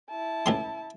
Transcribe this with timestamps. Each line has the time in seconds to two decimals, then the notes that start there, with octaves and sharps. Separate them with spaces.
0.10 E4 A5
0.46 C#2 A2 C6